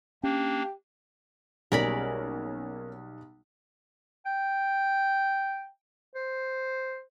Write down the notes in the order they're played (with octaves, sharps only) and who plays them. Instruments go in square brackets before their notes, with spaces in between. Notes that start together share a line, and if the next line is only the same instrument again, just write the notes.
[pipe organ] A#3 D4 [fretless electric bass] C#4 [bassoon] G4
[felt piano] B1 G3 [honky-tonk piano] A#3 C#4 G#4 [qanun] A#4 D5 B5
[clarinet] G5
C5